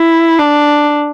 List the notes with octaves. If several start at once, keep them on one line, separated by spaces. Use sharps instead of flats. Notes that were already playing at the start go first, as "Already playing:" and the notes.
Already playing: E4
D4